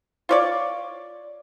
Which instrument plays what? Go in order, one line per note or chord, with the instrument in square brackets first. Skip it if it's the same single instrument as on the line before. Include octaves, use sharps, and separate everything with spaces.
[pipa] F4 C#5 D5